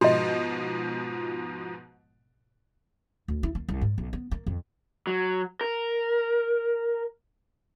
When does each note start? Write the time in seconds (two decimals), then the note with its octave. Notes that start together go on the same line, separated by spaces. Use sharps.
0.01 G#2 B2 F3 F#4 D#5
3.28 D2
3.43 E4
3.55 A#3
3.69 C2
3.81 G#2
3.98 B1
4.13 B3
4.31 A#3
4.46 F2
5.07 F#3
5.61 A#4